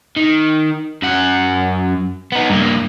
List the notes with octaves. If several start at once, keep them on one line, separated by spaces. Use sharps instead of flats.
D#3
F#2 F#5
B3 D#4
G2 A#3